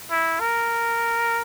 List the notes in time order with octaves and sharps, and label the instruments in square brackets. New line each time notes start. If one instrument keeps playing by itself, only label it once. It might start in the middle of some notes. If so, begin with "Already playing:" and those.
[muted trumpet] E4
A#4